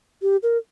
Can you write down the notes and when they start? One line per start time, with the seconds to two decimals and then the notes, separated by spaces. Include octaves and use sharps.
0.22 G4
0.43 A#4